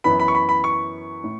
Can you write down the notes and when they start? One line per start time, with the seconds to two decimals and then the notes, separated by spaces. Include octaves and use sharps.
0.04 F#2 E3 B3 B5
0.19 B5
0.28 C#6
0.35 B5
0.49 B5
0.64 C#6
1.24 A2